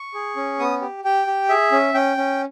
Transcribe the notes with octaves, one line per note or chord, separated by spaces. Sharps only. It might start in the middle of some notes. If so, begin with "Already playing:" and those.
Already playing: C#6
G#4
C#4
B3 D#6
G4
G4 G5
G4
G#4 E5
C#4
C#4 G5
C#4